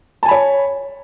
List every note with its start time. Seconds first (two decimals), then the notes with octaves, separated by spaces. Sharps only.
0.23 A5
0.26 G#5
0.28 B5
0.31 C#5